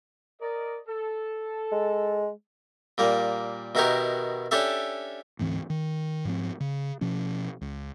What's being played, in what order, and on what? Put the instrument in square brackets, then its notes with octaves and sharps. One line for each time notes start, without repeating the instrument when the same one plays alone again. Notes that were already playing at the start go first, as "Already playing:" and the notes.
[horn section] A#4 D5 D#5
A4
[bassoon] G#3
[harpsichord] A#2 G3 A#3
B2 D#3 E4 F#4 G4 A#4
C#4 D4 E4 G4 A4 E5
[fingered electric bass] D2 G#2 E3 C4
D#3
G#2 F3 C4
C#3
B2 F3 C#4
C#2